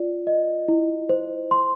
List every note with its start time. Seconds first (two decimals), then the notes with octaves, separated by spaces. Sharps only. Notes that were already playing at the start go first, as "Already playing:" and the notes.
Already playing: F4 D5
0.27 D#5
0.68 E4
1.09 C5
1.51 C6